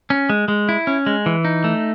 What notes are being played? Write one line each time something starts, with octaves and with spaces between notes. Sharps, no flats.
C#4
G#3
G#3
E4
C#4
G#3
E3
D#4
A3